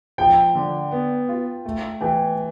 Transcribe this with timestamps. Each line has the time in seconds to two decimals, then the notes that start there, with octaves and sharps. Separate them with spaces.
0.18 F3 G5
0.55 D3
0.91 B3
1.28 F4
1.65 A3
2.01 E3 G5